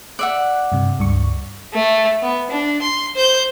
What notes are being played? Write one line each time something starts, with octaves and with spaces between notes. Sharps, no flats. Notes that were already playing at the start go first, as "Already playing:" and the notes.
D5 E5 F#5 F#6
G2 C3
C#2 G2 C#6
A3
B3
D4
C6
C5 G6